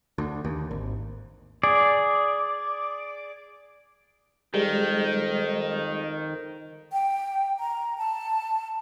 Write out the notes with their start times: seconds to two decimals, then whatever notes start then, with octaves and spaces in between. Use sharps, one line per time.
0.18 D2
0.45 D#2
0.71 G#1
1.63 G#4 D5
4.54 F2 D#3 G3 G#3
6.93 G5
7.59 A#5
7.98 A5